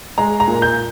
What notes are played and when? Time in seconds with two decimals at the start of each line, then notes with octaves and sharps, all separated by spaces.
0.18 G#3 A#5
0.40 A#5
0.47 A#2
0.62 G6